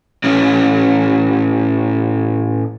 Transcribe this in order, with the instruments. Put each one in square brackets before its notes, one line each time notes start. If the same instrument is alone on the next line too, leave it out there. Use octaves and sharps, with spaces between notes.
[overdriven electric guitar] A2 C#4